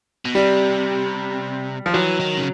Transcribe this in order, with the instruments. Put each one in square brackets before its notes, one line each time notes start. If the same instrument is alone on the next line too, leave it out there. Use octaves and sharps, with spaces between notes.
[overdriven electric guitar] B2
[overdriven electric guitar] C3 [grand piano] G3
[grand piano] F3
[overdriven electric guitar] E3 [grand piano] F#3
[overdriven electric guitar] D#3
C#3